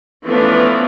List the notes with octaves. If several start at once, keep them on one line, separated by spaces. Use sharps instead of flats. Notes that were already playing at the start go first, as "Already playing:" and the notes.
E3 F3 A3 B3 C#4 D4